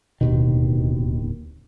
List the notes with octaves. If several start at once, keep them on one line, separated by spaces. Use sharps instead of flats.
D1 D#2 B2 D#3